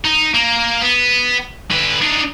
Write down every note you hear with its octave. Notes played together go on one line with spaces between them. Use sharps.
D#4
A#3
B3
D3 B4
D4 D#4